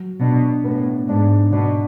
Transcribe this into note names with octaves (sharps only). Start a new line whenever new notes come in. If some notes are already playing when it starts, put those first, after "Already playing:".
Already playing: F#3
B2 D4
A2 B3
G#2 D4
B2 D4